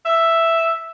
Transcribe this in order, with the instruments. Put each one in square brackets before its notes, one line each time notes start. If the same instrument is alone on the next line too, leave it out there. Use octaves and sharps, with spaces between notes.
[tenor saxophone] E5